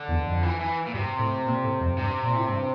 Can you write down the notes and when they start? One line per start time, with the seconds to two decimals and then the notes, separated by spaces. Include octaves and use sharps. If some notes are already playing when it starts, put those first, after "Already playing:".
Already playing: D3
0.08 E2
0.26 F2
0.43 E3
0.60 E3
0.86 A#2
0.94 G2 C3
1.19 A2
1.46 A#2
1.63 A2
1.80 F2
1.97 G2 C3
2.23 A#2
2.36 A2
2.49 G2